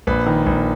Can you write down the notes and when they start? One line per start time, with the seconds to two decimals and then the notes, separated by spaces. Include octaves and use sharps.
0.07 A#1 B4
0.26 D#3
0.46 A#1